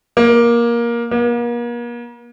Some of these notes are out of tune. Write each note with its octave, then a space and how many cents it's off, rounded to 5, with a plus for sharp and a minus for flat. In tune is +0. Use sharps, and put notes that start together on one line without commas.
A#3 +15
A#3 +40